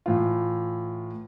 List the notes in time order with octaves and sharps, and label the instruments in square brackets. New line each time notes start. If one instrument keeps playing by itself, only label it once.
[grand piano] A2 E3 F4